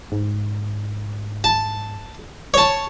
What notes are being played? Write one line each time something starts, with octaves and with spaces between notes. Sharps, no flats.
G#2
A5
C#5 A5